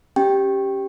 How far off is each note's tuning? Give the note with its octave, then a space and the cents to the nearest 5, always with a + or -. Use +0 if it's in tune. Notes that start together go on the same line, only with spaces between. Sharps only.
C#4 +0 G4 +0 G5 +0